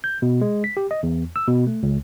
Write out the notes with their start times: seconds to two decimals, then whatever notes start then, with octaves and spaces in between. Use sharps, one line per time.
0.04 G6
0.22 B2
0.41 G#3
0.64 B6
0.77 G4
0.91 D#5
1.03 E2
1.36 E6
1.47 B2
1.67 A3
1.83 C#2